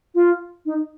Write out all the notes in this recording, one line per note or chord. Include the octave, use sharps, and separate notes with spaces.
F4
D#4